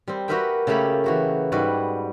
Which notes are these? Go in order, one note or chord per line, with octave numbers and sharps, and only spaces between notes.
G3 C4
F#4 G4 A#4 B4 E5 G5
C#3 A3 A#3 G4 A4 B5
E3 F#4 G4
G#2 G3 F#4 B4